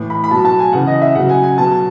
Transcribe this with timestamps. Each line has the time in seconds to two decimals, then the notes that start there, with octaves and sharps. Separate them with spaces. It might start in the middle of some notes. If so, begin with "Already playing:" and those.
Already playing: A2 E3
0.10 B5
0.24 B5
0.31 B2 F#3 A5
0.45 A5
0.59 G#5
0.73 C#3 E3 F#5
0.87 D#5
1.01 E5
1.15 C#3 F#3 F#5
1.29 G#5
1.43 G#5
1.58 B2 F#3 A5